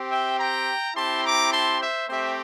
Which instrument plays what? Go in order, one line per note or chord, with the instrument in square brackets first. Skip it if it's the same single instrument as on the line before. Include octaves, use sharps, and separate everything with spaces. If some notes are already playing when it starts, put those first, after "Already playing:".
Already playing: [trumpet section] C4 G4
E5 G5
G5 A#5
C4 E4 G4 A5 C6
A#5 D6
A5 C6
C5 E5
A3 C4 G4 C5 E5